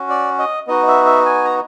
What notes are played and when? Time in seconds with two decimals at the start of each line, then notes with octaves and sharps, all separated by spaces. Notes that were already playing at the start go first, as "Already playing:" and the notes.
Already playing: C#4 F#4
0.10 D5
0.39 D#5
0.67 B3 D#4 F#4 D#5
0.88 E5
1.06 E5
1.26 G#5
1.44 A#5